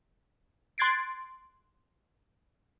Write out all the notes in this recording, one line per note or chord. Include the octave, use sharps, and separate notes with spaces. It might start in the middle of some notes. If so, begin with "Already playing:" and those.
C6 F#6 G#6 A6 C7 D7